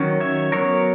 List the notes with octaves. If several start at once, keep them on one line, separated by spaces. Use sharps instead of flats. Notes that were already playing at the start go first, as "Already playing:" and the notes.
Already playing: D#3 F#3 C#4
C#5 E5
F#3 B3 A#4 C#5